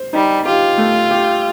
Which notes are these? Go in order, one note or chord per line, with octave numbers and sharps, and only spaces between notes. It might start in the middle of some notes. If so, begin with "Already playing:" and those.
Already playing: C5
G3 D#4
F4 G4
A3
G4